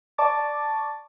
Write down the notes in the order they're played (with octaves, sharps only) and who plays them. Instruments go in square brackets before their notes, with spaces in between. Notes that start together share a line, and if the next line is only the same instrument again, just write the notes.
[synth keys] D5 A5 C#6 D6 A6